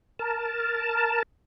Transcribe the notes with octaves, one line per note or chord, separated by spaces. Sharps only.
A#4 A5